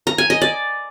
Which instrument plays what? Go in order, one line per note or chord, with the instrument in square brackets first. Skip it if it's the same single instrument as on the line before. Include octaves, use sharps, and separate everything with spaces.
[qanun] A#5
G#5
D#5
D5